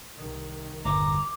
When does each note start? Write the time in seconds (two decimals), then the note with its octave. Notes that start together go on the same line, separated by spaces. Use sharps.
0.17 C2 D#3
0.85 G1 E2 A#2 A#5 D6